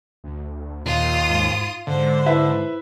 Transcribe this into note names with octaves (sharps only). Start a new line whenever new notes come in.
D2
D#2 A#2 F4 D#6
G#2
G#2 D3 C5
E4 B4 E5